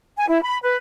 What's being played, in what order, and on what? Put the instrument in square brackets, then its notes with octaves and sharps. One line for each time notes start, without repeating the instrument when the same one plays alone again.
[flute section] G#5
E4
B5
B4